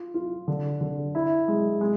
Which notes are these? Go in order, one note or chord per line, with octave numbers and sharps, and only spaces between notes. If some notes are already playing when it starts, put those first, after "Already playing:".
Already playing: F4
F4
D3
D3
E4
G#3
G#3